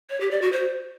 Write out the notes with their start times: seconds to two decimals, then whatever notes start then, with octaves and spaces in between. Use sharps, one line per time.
0.10 C#5
0.21 G4
0.31 D5
0.42 F#4
0.52 C5